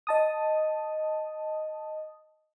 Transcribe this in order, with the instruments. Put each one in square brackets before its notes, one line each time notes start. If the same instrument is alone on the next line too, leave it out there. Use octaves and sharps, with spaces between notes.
[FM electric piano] D#5 A5 D#6